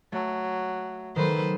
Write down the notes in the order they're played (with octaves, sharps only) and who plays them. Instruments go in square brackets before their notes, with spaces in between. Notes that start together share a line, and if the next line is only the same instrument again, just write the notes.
[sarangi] F#3 [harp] A3
[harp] D#3 F#3 [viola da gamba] A4 B4 C5